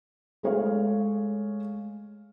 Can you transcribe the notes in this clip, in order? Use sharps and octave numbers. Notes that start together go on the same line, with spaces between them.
G#3 A3 G#4 C#5 F5